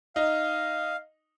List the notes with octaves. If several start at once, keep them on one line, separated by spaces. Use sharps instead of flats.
D#4 F5